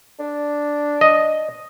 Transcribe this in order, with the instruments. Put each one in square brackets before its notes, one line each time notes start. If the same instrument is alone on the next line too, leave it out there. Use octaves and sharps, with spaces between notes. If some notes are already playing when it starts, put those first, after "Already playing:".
[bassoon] D4
[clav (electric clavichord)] D#5